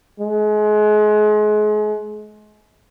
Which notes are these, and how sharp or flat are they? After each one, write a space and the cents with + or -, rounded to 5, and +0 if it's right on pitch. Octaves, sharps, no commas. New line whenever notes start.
G#3 +30